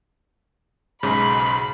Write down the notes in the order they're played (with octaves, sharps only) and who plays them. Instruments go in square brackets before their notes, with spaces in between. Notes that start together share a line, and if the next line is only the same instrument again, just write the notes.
[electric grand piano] B1 G#2 C#3 [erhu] B5